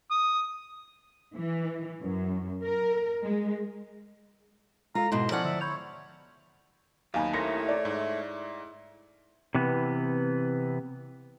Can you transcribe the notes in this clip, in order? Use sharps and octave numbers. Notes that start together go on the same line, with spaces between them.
D#6
E3
F#2
A#4
G#3
G#3 F4 A4 A#5
G#2 B2 B3 E4 C6
F3 C#4 D5 F#5
D3 E5
C#5 B5 G6 F7
D#2 B2 F#3 D#4 F5 G#5 B5
A3 E4 G4 A#4 C#5 C6 A#6 C#7
D5
G#2 E4
C3 E3 B3